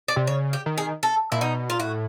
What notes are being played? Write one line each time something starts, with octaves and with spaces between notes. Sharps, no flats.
D5
C3
C#3 C#5
G4
D#3
G#4
A4
A#2 E4
B2 D#4
A#2 F4
A2 F#4